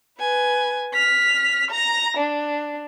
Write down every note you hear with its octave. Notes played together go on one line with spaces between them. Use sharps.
B4 G#5
F6 B6
A#5 A#6
D4